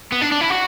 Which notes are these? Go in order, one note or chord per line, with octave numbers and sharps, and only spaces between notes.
B3
D4
D4
E4
F#4